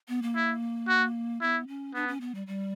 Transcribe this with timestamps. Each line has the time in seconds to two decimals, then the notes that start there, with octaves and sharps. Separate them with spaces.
0.08 B3
0.22 A#3
0.36 E4
0.88 F#4
1.41 B3 E4
1.67 C#4
1.94 B3 D4
2.08 C#4
2.20 B3
2.34 G3
2.47 G3